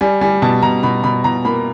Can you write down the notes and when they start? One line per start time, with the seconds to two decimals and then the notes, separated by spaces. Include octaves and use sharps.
0.01 G3 G#5
0.21 G3 G#5
0.42 B2 A5
0.62 B2 A#5
0.83 B2 B5
1.04 B2 B5
1.24 B2 A#5
1.45 A#3 B5